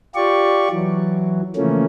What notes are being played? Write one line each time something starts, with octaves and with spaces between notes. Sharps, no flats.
F4 G4 D5 C#6
E3 F#3
C#3 E3 F3 A3 A#3 C#4